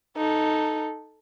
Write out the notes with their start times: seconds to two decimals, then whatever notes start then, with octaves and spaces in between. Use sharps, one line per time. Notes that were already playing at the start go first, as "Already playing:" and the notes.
0.17 D#4 A4